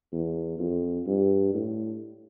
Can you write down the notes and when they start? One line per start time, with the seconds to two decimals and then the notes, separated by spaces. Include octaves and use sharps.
0.12 E2
0.59 F2
1.07 G2
1.54 A2